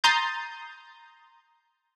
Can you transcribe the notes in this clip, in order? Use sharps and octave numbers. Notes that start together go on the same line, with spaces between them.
A#5 C6 D#6 G6 A6